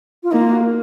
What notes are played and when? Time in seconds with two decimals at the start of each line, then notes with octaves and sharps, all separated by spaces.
0.23 F4
0.31 A#3 D#4
0.41 F4
0.52 F#4
0.61 A#4